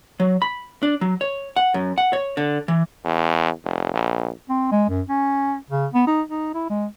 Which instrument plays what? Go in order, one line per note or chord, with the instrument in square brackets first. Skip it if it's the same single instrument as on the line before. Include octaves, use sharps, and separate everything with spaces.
[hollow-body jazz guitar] F#3
B5
D4
F#3
C#5
F#5
F#2
F#5
C#5
D3
E3
[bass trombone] E2
F1
A#1
[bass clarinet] C4
G#3
F#2
C#4
C#3
B3
D#4
D#4
E4
G#3